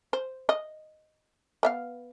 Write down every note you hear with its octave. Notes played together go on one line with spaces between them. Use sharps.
C5
D#5
B3 E5 F5